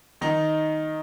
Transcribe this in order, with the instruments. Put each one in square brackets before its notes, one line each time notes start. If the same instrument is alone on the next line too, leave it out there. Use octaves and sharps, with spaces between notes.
[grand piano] D#3 D#4